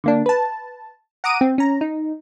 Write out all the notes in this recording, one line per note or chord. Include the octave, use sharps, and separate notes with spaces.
D3 A#3 D4
B4 A5
F#5 A#5 D6 D#6 D7 D#7
C4
C#4 A#5
D#4